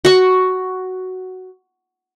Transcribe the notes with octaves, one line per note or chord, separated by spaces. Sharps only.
F#4 C#6